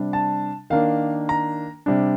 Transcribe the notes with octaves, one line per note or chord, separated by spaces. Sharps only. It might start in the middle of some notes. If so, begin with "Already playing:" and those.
Already playing: C3 G3 D4
A5
D#3 A#3 D4 F5
A#5
C3 G3 D4